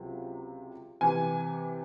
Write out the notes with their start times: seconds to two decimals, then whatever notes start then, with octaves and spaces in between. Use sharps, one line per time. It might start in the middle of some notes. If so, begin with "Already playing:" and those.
Already playing: C#2 C3 F#3
1.01 C3 E3 G#5